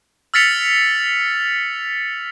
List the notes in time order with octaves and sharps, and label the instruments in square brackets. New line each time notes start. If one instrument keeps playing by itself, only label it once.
[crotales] E6 F6 A6 B6 C#7 F7